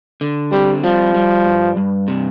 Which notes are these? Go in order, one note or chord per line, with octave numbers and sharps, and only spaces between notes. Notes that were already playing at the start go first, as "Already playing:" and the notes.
D3
G3 C4
F3 G3
G3
G2
G2
C3